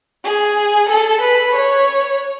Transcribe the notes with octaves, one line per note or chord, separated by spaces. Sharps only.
G#4
A4
B4
C#5